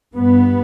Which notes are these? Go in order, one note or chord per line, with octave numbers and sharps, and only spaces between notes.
G2 B3